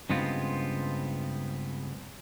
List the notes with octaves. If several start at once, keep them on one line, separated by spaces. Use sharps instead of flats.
G2 C#3 G#3 B3 C4 F4